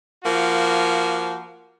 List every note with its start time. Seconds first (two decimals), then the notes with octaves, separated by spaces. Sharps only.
0.24 F3 A#3 F#4